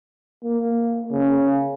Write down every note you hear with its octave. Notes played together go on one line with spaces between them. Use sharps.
A#3
C#3